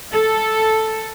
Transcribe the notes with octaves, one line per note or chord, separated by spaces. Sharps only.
A4